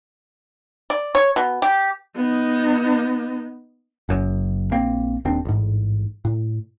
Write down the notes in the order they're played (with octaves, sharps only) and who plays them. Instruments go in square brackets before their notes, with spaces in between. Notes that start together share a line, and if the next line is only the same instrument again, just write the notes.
[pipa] D5
C#5
B2
G4
[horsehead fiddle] B3 D#4
[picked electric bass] F#1 F#2
A#1 A#3 C4
D#1 D#2 C4 D4
A1 G#2
A2